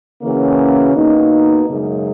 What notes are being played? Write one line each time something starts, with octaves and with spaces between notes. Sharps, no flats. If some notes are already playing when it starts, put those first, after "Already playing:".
C#3 E3 A#3 C#4 F#4
B2 A#3 D#4
F#2 C#3 G#3